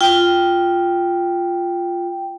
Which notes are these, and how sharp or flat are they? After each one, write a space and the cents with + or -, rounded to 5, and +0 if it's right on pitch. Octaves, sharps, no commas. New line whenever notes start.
F4 +0 G5 +0